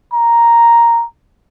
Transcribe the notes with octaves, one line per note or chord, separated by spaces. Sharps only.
A#5